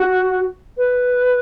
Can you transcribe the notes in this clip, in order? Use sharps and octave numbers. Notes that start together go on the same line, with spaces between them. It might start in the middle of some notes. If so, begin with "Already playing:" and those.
Already playing: F#4
B4